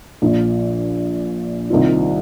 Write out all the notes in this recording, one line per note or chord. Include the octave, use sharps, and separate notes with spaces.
A#1 A#2 F3
C2 C3 D#3 C4 F4